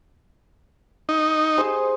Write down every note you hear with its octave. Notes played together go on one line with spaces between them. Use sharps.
D#4
G#4 C5